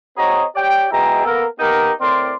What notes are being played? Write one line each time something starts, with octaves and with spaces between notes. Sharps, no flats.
C4 F#4 G#4 C#5 D#5 A#5
G4 C#5 D5 G5
B2 G#3 E4 G#4 G5 A#5
A#3 B3 A4 A#4
A#3 B3 D#4 G4 A#4
A2 C4 A#4 D5 C6